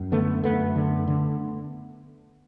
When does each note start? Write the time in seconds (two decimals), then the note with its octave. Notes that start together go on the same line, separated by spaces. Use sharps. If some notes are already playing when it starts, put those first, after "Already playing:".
Already playing: F#2
0.12 D3 A3 B3
0.44 F#2 A3 B3
0.76 D3
1.08 D3